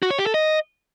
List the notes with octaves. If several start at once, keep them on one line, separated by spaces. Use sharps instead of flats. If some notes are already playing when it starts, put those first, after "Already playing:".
F#4
C#5
G4
A4
D#5